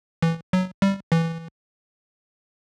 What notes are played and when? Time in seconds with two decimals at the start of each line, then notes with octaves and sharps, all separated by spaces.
0.22 E3
0.53 F#3
0.82 G3
1.12 E3